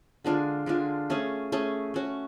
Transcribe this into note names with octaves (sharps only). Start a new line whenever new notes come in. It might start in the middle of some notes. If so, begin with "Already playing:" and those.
D3 G#3 D4 F4
D3 G#3 D4 F4
A3 C#4 G#4
A3 C#4 G#4
A3 C#4 F#4